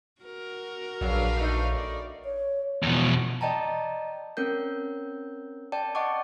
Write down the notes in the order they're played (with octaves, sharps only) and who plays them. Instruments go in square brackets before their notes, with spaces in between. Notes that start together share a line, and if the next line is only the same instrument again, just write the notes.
[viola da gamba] F#4 A#4
[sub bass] A#1 [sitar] C#3 F#3 [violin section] D4 B4 F5
[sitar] A3 D#4
[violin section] D5
[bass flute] C#5
[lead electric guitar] E2 B2 [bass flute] F3
[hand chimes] D5 D#5 G5 A5 A#5
C4 C#4 A#4 G6
D5 G5 A5
D#5 F#5 A5 C#6 D6